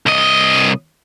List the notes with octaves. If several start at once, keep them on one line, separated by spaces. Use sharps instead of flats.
C2 D#5